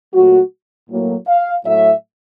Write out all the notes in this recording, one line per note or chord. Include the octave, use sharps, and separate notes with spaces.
A#2 F#3 A3 F#4
A2 F#3 A#3
F5
A2 F#3 A3 E5